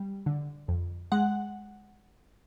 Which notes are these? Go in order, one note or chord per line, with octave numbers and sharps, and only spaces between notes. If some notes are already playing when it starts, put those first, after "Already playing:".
Already playing: G3
D3
F2
G#3 F#5